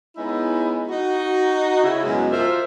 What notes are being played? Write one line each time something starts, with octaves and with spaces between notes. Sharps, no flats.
G#3 B3 C#4 D#4 E4
D#4 F#4
C#3 E4
F#2 B2 F#3 G#3
F3 F4 A#4 C5 E5